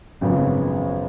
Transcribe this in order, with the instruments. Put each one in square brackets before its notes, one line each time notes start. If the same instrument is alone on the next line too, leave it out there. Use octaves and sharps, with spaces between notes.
[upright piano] G#1 F#2 C#3 F3 B3